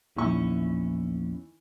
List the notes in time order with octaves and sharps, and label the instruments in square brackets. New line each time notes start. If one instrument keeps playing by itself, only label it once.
[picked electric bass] A#1 [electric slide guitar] E2 C#4 [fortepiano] D#3 E3 C#6